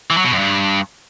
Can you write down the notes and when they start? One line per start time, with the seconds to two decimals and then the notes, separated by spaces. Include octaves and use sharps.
0.10 E3
0.17 F#3
0.24 B2
0.31 F#2
0.38 G2